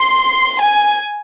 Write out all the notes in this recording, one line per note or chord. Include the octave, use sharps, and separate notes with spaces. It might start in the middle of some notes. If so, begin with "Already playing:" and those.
Already playing: C6
G#5